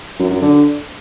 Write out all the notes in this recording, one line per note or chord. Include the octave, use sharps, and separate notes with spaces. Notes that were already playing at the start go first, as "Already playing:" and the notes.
F#2
F#2
D3